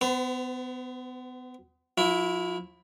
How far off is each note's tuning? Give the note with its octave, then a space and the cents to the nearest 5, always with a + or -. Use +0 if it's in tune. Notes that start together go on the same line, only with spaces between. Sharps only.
B3 +30 C5 -35
F3 +40 E4 +0